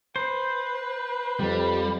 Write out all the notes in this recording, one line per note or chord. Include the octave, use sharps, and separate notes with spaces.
B4 C5
F2 G3